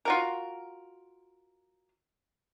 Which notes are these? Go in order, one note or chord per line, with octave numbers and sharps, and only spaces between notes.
F4 F#4 A#4